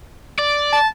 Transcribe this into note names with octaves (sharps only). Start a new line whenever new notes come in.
D5
A5